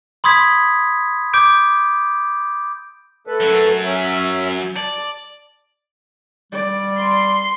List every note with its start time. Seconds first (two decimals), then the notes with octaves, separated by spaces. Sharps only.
0.24 B5 C6 D#6 G#6 B6
1.34 D6 G6 D7
3.27 A3 A4 B4
3.40 F#2 F#3
3.85 C#4 E5
4.76 D5 A5
6.52 G3 D5
6.98 C6